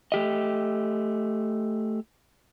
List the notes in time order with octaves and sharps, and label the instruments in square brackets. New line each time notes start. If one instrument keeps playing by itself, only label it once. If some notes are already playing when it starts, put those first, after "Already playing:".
[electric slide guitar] A3 G4 D#5